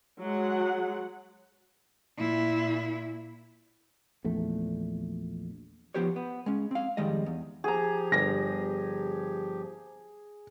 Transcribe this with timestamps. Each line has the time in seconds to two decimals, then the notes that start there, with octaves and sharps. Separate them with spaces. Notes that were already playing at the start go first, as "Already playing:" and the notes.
0.20 F#3 G#3 F#5
2.18 A#2 E4
4.24 A#1 E2 A3
5.94 F3 B3 G4 C5 C#5
6.16 B3
6.46 G#3 C#4
6.71 C4 F5
6.97 F2 D#3 G3 G#3 D#5
7.26 E2
7.64 F3 G4 G#4 A#5
8.12 G1 A#6